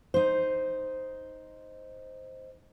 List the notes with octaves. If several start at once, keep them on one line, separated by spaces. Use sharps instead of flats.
D#4 C5